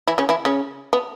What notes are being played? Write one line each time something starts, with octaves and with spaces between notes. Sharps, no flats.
E3 E4
C#3 C#4
E3 E4
C#3 C#4
B3